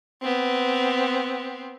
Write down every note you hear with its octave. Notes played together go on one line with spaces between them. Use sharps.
B3 C4